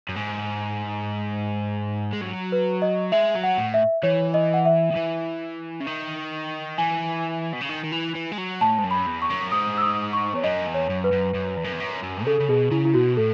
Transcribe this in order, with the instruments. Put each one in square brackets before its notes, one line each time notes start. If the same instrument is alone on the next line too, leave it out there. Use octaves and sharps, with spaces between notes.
[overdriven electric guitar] F#2
G#2
G#3
F#3
[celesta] B4
D#5
[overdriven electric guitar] G#3 [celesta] E5
[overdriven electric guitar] F#3
[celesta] F#5
[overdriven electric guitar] A2
[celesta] E5
[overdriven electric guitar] E3 [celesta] C#5
[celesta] D#5
F#5
E5
[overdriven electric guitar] D#3
E3
C#3
D#3
[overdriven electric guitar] E3 [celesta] G#5
[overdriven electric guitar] B2
C#3
D#3
D#3
E3
E3
G#3
F#3
[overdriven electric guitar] A2 [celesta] A5
[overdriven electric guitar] G#2
F#2
[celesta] B5
[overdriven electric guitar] E2
[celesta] C#6
[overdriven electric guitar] F#2
[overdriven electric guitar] G#2 [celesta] D#6
[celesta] E6
D#6
C#6
[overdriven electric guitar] E2 [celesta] C#5
[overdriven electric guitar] F#2 [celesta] D#5
[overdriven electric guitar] E2
[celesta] C#5
[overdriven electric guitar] F#2
[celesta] B4
[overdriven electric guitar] F#2
F#2
E2
F#2
E2
F#2
F#2
[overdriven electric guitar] C#3 [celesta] A4
[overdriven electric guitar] C#3
[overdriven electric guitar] B2 [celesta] G#4
[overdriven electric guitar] C#3 [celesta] E4
[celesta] E4
[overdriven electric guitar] B2 [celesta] F#4
[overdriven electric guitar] A2 [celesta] A4